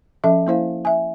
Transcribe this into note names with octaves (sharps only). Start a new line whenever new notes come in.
F3 C#4 A4 E5 A5
A#3 E4 C5 F5
E5 G#5